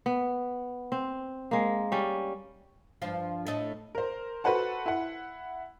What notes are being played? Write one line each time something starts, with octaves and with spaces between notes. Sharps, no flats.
B3
C4
G#3 A#3
G3 C#4
G2 F3 F4
A2 A3 D#5
A#4 C5
F#4 A4 B4 C5 F#5 A5
E4 F#5